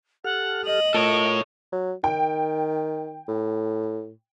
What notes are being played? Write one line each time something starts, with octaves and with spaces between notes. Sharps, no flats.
G4 A4 F#5 F6
D#5 F#7
A3 F4 A4 A#4 C#5 D7
F#3
D#3 G5
A2